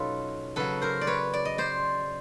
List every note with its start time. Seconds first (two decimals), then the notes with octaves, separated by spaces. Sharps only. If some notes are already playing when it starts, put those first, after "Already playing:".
Already playing: B2 F#3 C#4 D#4 F4 A4 B4
0.56 C#3 F#3 A4 B4
0.82 A#4 C5
1.01 D5
1.07 B4 C#5
1.33 D5
1.45 D#5
1.58 C5 D5